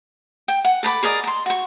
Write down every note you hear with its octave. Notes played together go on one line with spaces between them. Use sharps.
G5
F#5
A4 A#5 B5 D6
G#4 A#4 D5 D#5
A#5 C6
F#4 C#6